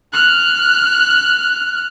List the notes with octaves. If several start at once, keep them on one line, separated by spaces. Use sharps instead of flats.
F6 F#6